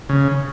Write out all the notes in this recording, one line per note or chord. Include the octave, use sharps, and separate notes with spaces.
C#3